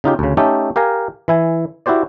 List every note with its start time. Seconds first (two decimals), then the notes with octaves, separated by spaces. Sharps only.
0.04 C#3 D#4 F4 G4
0.19 D2 C#3
0.37 A3 C#4 D#4 G4 A4
0.76 G4 A#4 F5 G#5 A#5
1.28 E3 E4 G#5
1.86 E4 F#4 G4 C5 D5